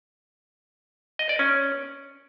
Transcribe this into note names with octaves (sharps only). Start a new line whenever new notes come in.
D#5
D5
C#4